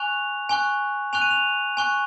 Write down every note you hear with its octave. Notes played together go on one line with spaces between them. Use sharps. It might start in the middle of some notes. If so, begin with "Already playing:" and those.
Already playing: G#5 C#6 F#6 F7
G#5 C#6 F#6
G#5 C#6 F#6 F7
D#7
F7
G#5 C#6 F#6